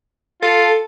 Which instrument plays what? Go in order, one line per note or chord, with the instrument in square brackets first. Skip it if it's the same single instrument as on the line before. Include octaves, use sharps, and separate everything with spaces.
[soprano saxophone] F4 [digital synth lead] A4